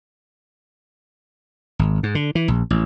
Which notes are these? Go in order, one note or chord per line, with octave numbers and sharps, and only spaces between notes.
G#1
G#2
D3
E3
A#1
A1